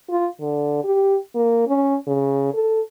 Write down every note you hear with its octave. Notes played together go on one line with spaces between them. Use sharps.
F4
D3
G4
A#3
C#4
C#3
A4